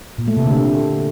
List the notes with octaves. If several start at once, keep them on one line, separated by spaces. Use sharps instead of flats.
A#2
A3
C3
D3